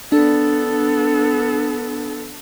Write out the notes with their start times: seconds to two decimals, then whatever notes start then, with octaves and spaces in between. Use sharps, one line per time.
0.12 B3 D4 A4